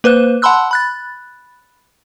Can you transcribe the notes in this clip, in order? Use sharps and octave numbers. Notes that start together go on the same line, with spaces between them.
A#3 B4 C5 F#6
F#5 A5 B5 C6 E6 F#6
B5 F#6 A6